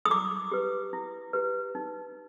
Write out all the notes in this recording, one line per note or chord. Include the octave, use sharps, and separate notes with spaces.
D#6
E4 D6
G4 B4
E4
G4 B4
D#4